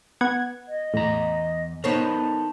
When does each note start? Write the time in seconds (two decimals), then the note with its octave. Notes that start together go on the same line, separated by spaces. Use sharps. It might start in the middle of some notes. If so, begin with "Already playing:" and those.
0.21 B3 F#5 G#6
0.68 D#5
0.94 E2 A2 A#5
1.84 B3 D#4 A4 A#4 C5 C#5 A5